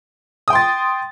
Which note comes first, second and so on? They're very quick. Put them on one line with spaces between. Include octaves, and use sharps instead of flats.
D#6 G5 C6 A6